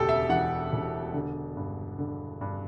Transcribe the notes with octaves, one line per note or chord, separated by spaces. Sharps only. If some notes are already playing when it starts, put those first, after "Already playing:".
Already playing: E1 D2 G4 A4
E5
E3 F#5
E1
D3
G2
D3
G2